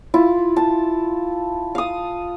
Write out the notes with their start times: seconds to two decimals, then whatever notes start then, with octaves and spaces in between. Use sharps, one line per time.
0.14 E4 F4
0.56 A5
1.75 F5 D#6